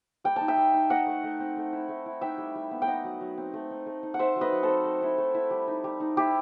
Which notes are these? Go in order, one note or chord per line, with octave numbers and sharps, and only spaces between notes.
G3 G5
D#4 A5
E5 G5
G3
D#4
D#4 D#5 F#5
A3
A3
C4
A3
E4
A3
E4
D#4 E5 G5
G3
G3
B3
G5
D#4 D#5 F#5
F#3
F#3
C4
A3
D#4
A3
D#4
F#5
D#4 C5 E5
F#3
B4 D#5
F#3
A4 C5
C4
A3
E4
A3
E4
G3
D#4
G3
D#4
E4 G4